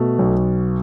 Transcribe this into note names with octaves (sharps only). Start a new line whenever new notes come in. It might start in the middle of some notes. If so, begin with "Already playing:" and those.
Already playing: B2 A3
B1